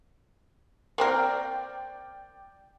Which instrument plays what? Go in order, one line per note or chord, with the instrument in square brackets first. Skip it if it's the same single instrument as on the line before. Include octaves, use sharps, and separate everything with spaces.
[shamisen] A#3 C4 A#4 [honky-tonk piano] D5 G5